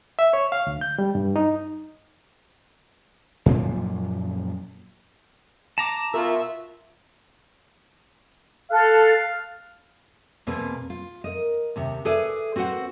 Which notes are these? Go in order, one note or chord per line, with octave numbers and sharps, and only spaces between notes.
E5
C#5
F5
D2
G6
G3
G2
D#4
F#2 A#2 F3 A#3
A5 A#5 D6
B2 F4 F#4 A#4 E5
A4 F5 F#6
E2 B2 A#3 C4 G#4 B4
F4
A#4 D#5
D#2 C3
G#4 A4 B4 D5 E5 G#5
C4 F#4 B4 C5 F#5